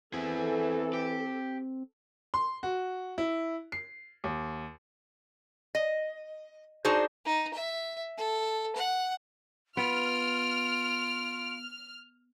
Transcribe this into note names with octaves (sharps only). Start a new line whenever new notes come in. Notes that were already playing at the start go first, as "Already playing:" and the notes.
E3 C4 E4 G#4 A4
G4
C6
F#4
E4
C7
D#2
D#5
D4 D#4 F#4 G#4 C5
D#4
E5
A4
F#5
B3 F4 F6 D7